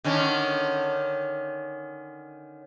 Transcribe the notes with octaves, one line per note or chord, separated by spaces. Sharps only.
D3 D#3 C#4